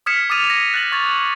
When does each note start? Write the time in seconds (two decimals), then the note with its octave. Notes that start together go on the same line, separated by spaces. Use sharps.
0.06 D#6 F6 G#6 B6 C#7 E7
0.30 D6 D#6 F6 A6 D#7 F7
0.50 A#6
0.74 F#6 A6 F#7
0.92 C#6 G#6 A6 F7